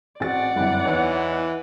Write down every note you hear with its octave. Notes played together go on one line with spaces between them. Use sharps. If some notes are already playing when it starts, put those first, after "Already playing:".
A1 C4 F#4 G#4 D5 F#5 A6
G1 F#2 G3 C4 E4
E2 E3 D#4 C#5